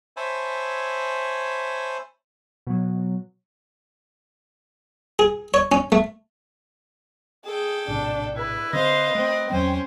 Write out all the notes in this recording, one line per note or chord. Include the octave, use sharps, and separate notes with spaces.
C5 C#5 E5 G#5 A5 B5
B2 F#3
G#4
C#5
C#4
A3
G#4 A4 G5
A#1 A2 C3 D4
E4 B4
D3 C4 C5 D#5 F5
A3 C4
E2 F#3 C4 C#4 C5 G5